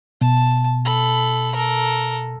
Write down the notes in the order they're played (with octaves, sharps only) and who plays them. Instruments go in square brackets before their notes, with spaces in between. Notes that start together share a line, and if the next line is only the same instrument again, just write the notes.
[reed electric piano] B2 [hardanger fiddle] A5
[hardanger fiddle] A4 B5
A4 A#4